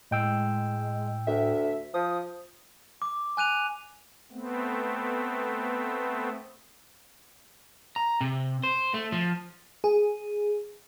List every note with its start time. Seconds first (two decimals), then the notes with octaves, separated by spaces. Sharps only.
0.11 A2 G#3 G5 E6
1.27 D2 E5
1.94 F3 D#6
3.02 D6
3.37 G#5 F#6 D#7 F7
4.32 A3 B3 C4
7.96 A#5
8.21 C3
8.63 C5
8.94 A3
9.12 F3
9.84 G#4